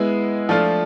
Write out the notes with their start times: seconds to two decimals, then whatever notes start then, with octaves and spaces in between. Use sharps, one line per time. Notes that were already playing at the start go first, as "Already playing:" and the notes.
Already playing: G#3 B3 E4
0.49 F3 A3 D4 F4